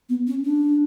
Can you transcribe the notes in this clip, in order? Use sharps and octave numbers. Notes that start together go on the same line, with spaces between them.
B3
C#4
D4